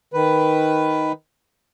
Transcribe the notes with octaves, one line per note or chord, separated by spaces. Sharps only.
D#3 B4